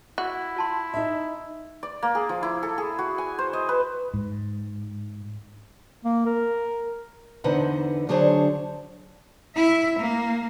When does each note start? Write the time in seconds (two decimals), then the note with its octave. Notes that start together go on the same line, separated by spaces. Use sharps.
0.18 E4 F#4
0.56 F4 A5 C6
0.94 D#4 E5
1.83 D5
2.03 A#3
2.15 G#4
2.29 F3
2.43 E4
2.63 A4
2.78 G#4
2.99 F#4
3.18 G#5
3.39 C5
3.53 D#5
3.69 B4
4.14 G#2
6.05 A#3
6.26 A#4
7.44 E2 D3 D#4 B4 C5 F#5
8.09 D3 F#3 D4 G#4 C5 C#5
9.56 E4 E5
10.00 A#3